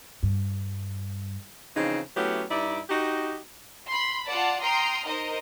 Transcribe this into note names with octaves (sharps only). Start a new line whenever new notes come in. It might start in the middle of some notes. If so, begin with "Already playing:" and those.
G2
C#3 E3 F3 C4 D#4
F#3 A3 B3 C#4 E4 G4
G2 D#4 E4 D5
D#4 F#4 G4
B5 C6
F4 D5 F#5 A5
G5 A#5 C6 D#6 F6
D#4 A#4 C5 D#5